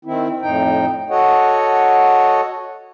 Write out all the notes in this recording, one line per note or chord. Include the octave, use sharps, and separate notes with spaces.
D#3 C4 E4
F2 A2 D#4 G5
F#4 A4 C#5 D#5 F#5